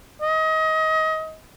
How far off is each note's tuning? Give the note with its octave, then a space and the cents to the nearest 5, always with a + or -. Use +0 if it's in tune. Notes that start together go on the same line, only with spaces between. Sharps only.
D#5 +25